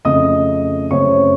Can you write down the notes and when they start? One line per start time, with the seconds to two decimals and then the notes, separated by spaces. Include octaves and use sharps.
0.05 F2 C#3 A3 D#5 D#6
0.91 F#2 C#3 A3 C4 C#5 C#6